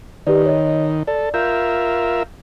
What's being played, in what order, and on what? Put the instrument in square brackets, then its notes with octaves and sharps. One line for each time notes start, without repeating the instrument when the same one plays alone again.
[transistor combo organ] D#3 [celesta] G4 B4 D5
[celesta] C#5 D#5
[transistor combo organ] A4 [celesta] D5
[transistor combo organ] F4 A#4 E5 [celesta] G6